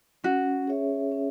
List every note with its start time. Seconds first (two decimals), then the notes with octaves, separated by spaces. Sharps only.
0.24 C#4 F#4
0.67 G#4 C#5 E5
1.12 C#4